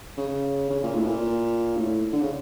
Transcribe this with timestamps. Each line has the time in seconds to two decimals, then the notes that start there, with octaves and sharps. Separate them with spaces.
0.17 C#3
0.70 C#3
0.83 A#2
0.95 A2
1.07 A#2
1.77 A2
2.13 D3
2.21 C#3